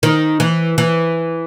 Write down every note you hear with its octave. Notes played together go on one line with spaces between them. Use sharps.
D#3
E3
E3